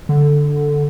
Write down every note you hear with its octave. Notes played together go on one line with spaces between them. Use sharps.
D3